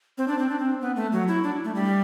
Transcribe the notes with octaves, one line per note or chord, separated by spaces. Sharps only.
C4
D4
C4
D4
C4
B3
A3
F#3
E4
D4
A3
G3